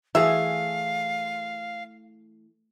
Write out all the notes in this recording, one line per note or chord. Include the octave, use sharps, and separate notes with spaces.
E3 A3 G#4 E5 F5